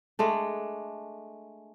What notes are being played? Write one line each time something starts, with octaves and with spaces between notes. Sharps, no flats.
G#3 A3 D4